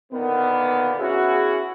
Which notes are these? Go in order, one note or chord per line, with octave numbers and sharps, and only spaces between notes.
A#2 D3 D#3 A#3 B3
C#4 E4 F#4 G#4